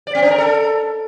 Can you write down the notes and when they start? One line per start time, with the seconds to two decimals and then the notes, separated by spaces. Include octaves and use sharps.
0.07 D5
0.15 C4
0.23 D4
0.30 A#4
0.38 A4